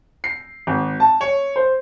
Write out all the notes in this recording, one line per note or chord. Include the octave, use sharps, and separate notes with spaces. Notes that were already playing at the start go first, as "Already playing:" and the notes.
C7
G#1
A5
C#5
C5